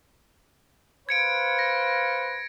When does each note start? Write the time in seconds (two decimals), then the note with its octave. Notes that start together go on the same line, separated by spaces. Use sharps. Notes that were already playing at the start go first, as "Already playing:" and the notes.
1.09 B4 C5 F5 G#6 C#7 D7
1.59 A#6